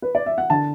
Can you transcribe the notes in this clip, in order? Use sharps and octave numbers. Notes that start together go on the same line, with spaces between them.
B4
D5
E5
F#5
D3 A5